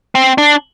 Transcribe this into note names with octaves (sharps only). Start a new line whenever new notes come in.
C4
D4